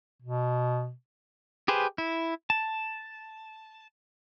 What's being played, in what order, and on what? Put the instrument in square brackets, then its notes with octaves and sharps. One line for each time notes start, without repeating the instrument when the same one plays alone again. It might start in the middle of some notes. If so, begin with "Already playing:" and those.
[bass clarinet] B2
[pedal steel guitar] G4 G#4 B4 C5
E4
A5